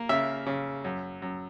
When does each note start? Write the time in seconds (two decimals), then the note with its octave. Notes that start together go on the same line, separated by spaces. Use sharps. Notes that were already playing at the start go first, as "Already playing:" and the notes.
Already playing: A#3
0.09 C#3 E5
0.47 C#3
0.84 F#2
1.22 F#2